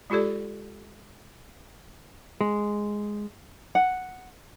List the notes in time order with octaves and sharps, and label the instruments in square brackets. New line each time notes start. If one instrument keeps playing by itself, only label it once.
[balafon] G#3 F4 G4 A4 D5
[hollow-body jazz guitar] G#3
[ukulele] F#5